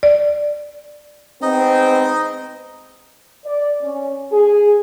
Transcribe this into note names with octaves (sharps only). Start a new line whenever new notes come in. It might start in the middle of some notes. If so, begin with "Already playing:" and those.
D5
G#3 B3 C4 D#4 D#5
D5
C#4
G#4